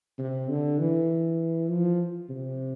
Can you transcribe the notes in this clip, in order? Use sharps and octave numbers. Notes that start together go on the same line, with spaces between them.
C3
D3
E3
F3
C3